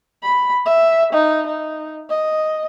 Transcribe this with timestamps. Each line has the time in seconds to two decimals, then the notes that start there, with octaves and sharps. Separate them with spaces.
0.23 B5
0.65 E5
1.13 D#4
1.47 D#4
2.10 D#5